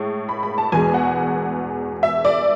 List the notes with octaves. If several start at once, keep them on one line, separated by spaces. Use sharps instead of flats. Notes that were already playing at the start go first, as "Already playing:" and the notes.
Already playing: A2 G#3
B5
B5
A5
E2 B2 G#3 G#5
F#5
E5
D5